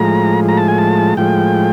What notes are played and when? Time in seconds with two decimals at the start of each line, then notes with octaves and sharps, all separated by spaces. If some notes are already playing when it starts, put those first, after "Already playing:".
Already playing: A2 F3 G#3 A#5
0.49 A#5
0.57 A5
0.68 G#5
0.78 A5
1.17 A2 F3 G#3 G5